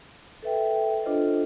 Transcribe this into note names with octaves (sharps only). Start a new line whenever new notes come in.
A4 B4 E5 G5
D4 F4 A4 C5 D#5